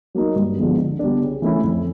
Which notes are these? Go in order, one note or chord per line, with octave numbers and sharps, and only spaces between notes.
F#3 A#3 D#4
G2
D3 F3 G#3 B3
D3
G3 B3 D4
C#3
E3 A3 C#4 E4
F2